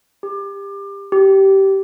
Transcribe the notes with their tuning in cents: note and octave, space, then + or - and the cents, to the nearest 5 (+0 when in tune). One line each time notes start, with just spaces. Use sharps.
G4 +25
G4 -15